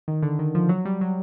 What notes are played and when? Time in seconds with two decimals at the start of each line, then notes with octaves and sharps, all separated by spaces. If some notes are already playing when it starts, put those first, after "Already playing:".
0.08 D#3
0.23 D3
0.39 D#3
0.55 F3
0.69 F#3
0.85 G3
1.01 F#3